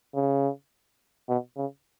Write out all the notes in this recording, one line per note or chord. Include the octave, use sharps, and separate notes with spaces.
C#3
B2
C#3